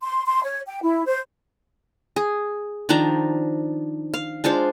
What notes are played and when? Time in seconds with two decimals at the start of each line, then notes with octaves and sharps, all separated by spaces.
0.02 C6
0.25 C6
0.43 C#5
0.67 G5
0.81 E4
1.05 C5
2.16 G#4
2.89 D#3 F3 D4 A#5
4.14 F5
4.44 G#3 D4 F4 C5